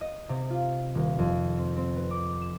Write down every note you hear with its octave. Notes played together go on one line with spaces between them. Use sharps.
D#5
C3
F4
D#1
F2
C4
C4
B4
D6
E7